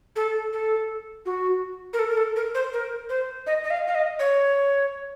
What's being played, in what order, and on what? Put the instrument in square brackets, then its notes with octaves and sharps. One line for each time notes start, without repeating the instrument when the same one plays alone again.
[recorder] A4
A4
F#4
A#4
A4
A#4
A4
A#4
C5
A#4
C5
D#5
D#5
F5
F5
D#5
C#5